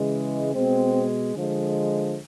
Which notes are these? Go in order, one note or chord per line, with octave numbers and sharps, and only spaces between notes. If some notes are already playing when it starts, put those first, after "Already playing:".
Already playing: C#3 E3 G#3
B2 G#3 C4
D3 F3 G#3